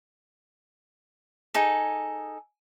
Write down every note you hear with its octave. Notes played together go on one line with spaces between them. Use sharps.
D#4 G#4 A4